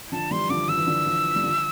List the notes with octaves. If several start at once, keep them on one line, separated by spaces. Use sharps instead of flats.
D3 F3 A5
E3 G3 C6
D3 F3 D6
F3 E6
E3
D3 F3
D3 F3
G3
D3 F3